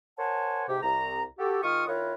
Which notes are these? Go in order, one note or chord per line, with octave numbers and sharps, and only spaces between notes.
A#4 C5 C#5 F#5 G#5 A5
G#2 C3 G4
C2 A#5
F#4 G4 A4
D#3 G#3 F4 C#6 D#6 F6
D#3 E4 F4 A#4 B4 C#5